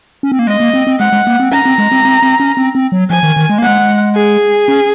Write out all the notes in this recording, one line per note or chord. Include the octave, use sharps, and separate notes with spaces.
C#4
C4
A#3
G#3 D#5
A#3
C4
C4
G#3 F#5
G#3
A#3
C4
C#4 A#5
C4
G#3
C4
C4
C4
C#4
C4
C4
F#3
F3 G#5
D#3
D#3
G#3
A#3
G#3 F#5
G#4
C#4